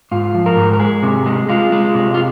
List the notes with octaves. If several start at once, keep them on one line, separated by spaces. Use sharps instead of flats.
G#2 F4
F3
A#4
G#2
A#4
G#3 G#4
C3
G#3
G#3 F4
G#3
C3
F4